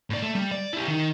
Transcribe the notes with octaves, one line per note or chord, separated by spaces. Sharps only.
A2 D5
A3
G3
D5
E4 G4
D#3